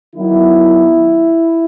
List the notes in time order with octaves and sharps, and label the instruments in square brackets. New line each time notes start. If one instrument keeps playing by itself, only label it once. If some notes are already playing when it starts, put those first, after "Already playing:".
[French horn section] D#3 F#3 B3 E4